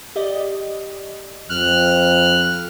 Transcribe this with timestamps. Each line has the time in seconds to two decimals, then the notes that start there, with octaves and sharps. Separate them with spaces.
0.16 G4 D5 D#5
1.50 F2 F6 F#6